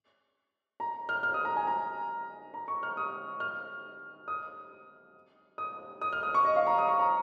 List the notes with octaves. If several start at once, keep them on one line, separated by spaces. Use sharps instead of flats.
A#5
F6
F6
D#6
A#5
G#5
A#5
A#5
C#6
F6
D#6
F6
D#6
D#6
D#6
F6
D#6
C#6
D#5
F5
A#5
D#6
C#6
A#5